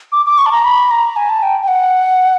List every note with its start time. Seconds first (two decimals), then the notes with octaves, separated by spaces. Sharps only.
0.12 D6
0.26 D6
0.38 C#6
0.46 A5
0.52 A#5
0.64 B5
0.91 A#5
1.16 G#5
1.29 A5
1.43 G5
1.62 G5
1.68 F#5